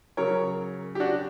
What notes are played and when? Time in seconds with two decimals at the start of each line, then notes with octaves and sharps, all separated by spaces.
0.17 C#3 F#3 A#4 C#5
0.95 G4
1.00 D4 F#4